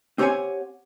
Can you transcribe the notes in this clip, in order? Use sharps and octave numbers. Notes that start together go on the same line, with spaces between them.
C4 G4 C5 C#5 F#5 G#5